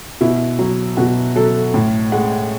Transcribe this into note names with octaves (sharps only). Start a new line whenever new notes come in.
B2 E4
F#3
B2 F#4
F#3 A4
A2
G#3 F#5